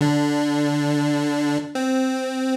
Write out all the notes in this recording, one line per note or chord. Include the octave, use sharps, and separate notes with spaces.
D3 D4
C4